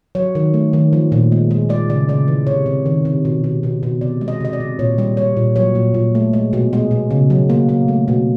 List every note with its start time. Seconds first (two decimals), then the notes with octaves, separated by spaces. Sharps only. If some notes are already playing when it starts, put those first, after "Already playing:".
0.15 F#3 C#5
0.35 D#3
0.54 A3
0.73 D#3
0.93 F3
1.12 A#2
1.32 G#3
1.51 G#3
1.69 G#3 D5
1.89 C#3 D5
2.08 C#3 D5
2.28 E3
2.47 C3 C#5
2.66 C3
2.86 D#3
3.05 C3
3.25 B2
3.44 B2
3.63 B2
3.83 B2
4.01 C3 D5
4.21 G#3
4.28 D#5
4.40 C3 D#5
4.53 D5
4.60 C3
4.79 A#2 C#5
4.98 G3
5.17 G3 C#5
5.37 A#2
5.56 F#3 C#5
5.75 A#2
5.94 A#2
6.15 A3
6.33 G#3
6.53 B2
6.73 G#3
6.91 B2
7.11 C#3
7.30 F#3
7.50 A#3
7.69 A#3
7.88 A3
8.08 B2